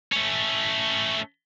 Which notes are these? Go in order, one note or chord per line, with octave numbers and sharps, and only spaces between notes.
A3 C#4